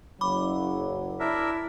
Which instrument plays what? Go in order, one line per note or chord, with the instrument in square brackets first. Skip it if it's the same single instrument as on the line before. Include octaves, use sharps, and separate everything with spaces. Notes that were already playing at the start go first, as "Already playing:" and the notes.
[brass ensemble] F#1 F#3 [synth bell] B5 D6
[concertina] D4 A#4 E5 [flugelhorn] E4